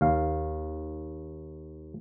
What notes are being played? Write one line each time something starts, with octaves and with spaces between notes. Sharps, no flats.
D#2 F5